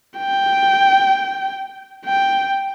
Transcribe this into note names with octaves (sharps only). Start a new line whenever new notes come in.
G5
G5